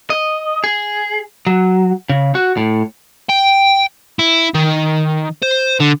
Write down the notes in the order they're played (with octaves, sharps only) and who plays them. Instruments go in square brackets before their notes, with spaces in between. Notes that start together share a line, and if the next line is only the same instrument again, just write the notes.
[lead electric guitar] D#5
G#4
F#3
C#3
F#4
A2
[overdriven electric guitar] G5
E4
D#3
C5
D3